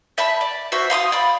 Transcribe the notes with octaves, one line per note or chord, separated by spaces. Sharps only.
E5 A5 B5
D5
F#4 C5 E5
F5 C6 C#6 D#6
D5 B5